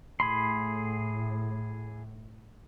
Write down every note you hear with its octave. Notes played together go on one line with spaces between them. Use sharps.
A2 G#4 B5 C6